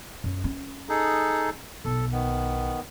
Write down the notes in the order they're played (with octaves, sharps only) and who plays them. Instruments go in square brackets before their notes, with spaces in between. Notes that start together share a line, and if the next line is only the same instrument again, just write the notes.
[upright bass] F#2
C#4
[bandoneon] D#4 G#4 A4
[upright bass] B1 [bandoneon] A4
[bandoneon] D#3 B3